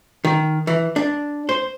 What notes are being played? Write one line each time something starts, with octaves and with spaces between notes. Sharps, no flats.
D#3
E3
D4
C5